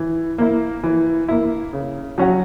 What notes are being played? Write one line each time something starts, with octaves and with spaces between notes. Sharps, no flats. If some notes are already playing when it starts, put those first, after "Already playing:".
Already playing: E3
A#3 E4
E3
A#3 E4
C#3
F#3 C#4 F#4